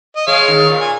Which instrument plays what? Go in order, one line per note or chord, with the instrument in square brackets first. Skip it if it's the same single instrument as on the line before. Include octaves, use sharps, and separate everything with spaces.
[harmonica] D#5
[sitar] G#3 [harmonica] C#5 F5
[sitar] D#3
A#2
[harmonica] G#5